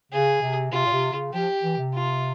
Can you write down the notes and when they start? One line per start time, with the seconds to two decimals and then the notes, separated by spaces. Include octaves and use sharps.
0.12 C#3 G#4
0.42 C3
0.72 C3 F4
0.86 A#2
0.93 C3
1.13 C#3
1.33 F3 G4
1.63 E3
1.78 C3
1.93 F4